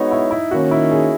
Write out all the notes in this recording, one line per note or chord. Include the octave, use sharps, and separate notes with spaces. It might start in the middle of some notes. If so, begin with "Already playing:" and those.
Already playing: G#3 B3 D#4 F#4 C#5
E4
E4
D#3 A#3 C#4 F#4
E4
G#4